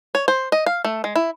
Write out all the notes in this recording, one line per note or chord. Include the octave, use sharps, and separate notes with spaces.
C#5
C5
D#5
F5
A3
G#3
E4